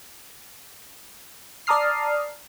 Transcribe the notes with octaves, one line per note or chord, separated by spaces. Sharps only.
D5 A5 A#5 D#6 F6 C7